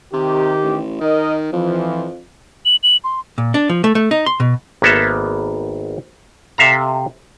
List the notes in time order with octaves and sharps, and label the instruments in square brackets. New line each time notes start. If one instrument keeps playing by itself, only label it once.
[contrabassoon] C3 [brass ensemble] D#3 G4
[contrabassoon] A1
[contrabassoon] D#3 [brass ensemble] A#4 D#5
[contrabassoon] F2 [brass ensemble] E3 F3
[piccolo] F#7
F#7
C6
[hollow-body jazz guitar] A#2
D4
F3
A3
A3
D#4
C6
B2
[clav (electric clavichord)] G#1 A#3 B3 A4 E5
C3 A4 E5 F5 A#5